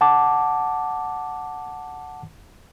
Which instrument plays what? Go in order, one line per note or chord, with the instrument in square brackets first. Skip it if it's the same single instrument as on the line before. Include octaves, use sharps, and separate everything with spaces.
[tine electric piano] F#5 A5 D6